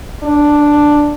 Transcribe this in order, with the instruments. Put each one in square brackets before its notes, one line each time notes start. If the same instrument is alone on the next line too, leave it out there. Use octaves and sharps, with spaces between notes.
[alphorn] D4